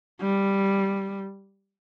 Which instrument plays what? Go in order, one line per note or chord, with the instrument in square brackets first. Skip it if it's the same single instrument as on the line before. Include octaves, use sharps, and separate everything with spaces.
[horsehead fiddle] G3